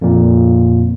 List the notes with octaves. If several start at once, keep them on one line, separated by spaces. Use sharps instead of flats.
F2 A#2